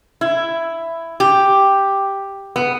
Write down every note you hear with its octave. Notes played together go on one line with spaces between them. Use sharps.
E4
G4
B3